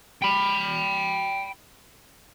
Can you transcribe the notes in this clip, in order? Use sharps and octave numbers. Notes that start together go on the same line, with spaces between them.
G5 B5